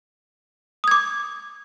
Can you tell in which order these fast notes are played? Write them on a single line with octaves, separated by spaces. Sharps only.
D#6 G#6 D6